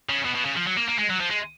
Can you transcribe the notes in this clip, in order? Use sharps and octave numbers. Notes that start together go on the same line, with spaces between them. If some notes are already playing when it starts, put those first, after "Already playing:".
C#3
B2
B2
C#3
F3
F#3
A#3
A#3
G#3
F#3
F3
G#3